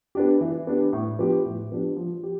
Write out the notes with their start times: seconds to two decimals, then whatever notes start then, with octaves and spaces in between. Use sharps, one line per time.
0.15 B3 D4 G4
0.41 E3
0.67 B3 D4 G4
0.93 A2
1.19 F3 B3 D4 G4
1.46 A2
1.71 F3 B3 D4 G4
1.96 F3
2.23 G4